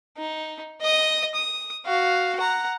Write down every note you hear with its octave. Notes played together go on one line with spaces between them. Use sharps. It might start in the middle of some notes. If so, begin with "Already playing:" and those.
D#4
D#5 D#6
D#6
F#4 F5
F#5 A#5